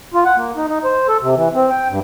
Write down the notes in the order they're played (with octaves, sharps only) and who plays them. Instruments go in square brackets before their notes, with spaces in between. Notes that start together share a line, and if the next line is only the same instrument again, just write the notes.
[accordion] F4
F#5
A#3
D#4
D#4
C5
A4
C3
E3
C4
G5
G2